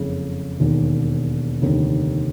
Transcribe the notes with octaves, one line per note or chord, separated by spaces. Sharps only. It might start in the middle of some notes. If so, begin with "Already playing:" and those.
Already playing: F#1 F2 C#3
E1 D#2 D#3
F1 D#2 D3